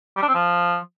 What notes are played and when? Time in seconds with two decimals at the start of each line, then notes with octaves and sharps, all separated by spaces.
0.16 G3
0.22 D4
0.28 C4
0.34 F3